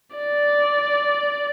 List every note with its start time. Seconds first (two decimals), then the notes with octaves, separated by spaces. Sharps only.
0.16 D5